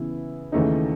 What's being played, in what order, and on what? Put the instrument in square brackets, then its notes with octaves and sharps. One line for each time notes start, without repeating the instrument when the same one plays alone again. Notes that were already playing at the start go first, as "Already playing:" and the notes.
Already playing: [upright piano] C#3 E3 B3 E4
D#2 C#3 E3 A3 D#4